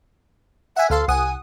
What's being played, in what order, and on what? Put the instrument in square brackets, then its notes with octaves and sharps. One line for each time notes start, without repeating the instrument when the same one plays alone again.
[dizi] E5 [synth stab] F#5 G#5
[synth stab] D2 F5 C6 [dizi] A4
[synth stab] C2 F#5 D#6 [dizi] G#5